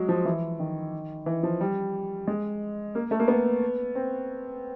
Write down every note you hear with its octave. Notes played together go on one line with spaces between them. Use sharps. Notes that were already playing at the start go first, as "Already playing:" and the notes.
Already playing: F#3 G#3
F3
E3
D#3
E3
F3
G3
G#3
A#3
A3
A#3
B3
C4